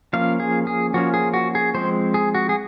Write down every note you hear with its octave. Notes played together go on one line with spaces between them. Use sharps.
F3 A#3 C#4 F5
G#4
G#4
F3 A#3 C#4 F#4
G#4
F#4
G#4
F3 G#3 C4 C5
G#4
F#4
G#4